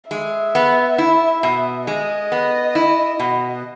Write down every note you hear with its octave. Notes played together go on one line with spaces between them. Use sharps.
G#3 E5
B3
E4
B2
G#3 D#5
B3
E4
B2